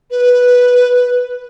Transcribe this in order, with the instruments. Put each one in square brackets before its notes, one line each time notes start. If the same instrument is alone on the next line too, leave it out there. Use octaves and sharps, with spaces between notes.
[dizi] B4